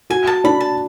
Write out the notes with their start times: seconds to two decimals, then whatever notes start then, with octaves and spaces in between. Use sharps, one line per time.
0.10 F#4 G#5
0.27 A5
0.44 D4 B5
0.60 A5